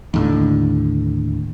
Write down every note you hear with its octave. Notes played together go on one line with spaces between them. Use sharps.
D#2 A2 D3